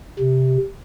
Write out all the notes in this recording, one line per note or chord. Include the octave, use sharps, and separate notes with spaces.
C3